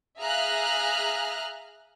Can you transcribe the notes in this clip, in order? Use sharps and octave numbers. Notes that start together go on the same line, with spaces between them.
G#4 E5 F5 A#5 F6 F#6